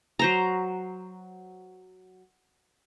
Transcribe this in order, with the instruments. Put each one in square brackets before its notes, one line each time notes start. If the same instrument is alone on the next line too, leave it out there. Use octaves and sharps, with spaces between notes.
[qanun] F#3 C5 A#5